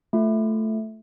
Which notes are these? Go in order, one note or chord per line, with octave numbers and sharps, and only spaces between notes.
A3 F4